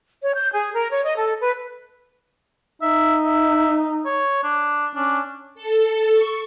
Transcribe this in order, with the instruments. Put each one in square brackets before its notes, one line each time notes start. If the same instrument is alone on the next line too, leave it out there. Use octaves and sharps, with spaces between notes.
[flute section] C#5
G6
G#4
A#4
C#5
D#5
A4
B4
[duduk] D#4 [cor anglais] E5
[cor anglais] E5
C#5
D4
[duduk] C#4 [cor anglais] D4
[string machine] A4
C#6